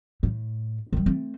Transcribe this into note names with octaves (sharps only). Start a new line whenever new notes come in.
A2
D#3 F#3
A3 C4